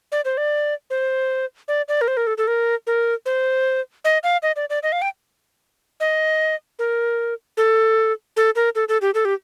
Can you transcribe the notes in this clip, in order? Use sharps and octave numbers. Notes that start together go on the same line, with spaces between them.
D5
C5
D5
C5
D5
D5
A#4
C5
A#4
A4
A4
A#4
A#4
C5
D#5
F5
D#5
D5
D5
D#5
F5
G5
D#5
A#4
A4
A4
A#4
A4
A4
G4
A4
G4